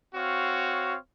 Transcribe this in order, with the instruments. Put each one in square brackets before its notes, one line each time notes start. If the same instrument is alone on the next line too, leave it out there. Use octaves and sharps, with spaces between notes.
[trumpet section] C4 F#4 C#5 F5